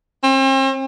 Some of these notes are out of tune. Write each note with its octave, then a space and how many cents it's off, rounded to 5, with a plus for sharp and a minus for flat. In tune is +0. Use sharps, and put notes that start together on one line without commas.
C4 +40